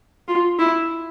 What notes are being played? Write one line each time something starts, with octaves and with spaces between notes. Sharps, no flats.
F4
E4